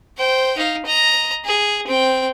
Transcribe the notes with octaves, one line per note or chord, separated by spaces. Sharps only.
C5 G5
D#4 F5
D#5 A#5
G#4
C4 G5